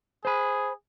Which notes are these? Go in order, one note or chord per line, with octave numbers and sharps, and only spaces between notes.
G#4 C5 B5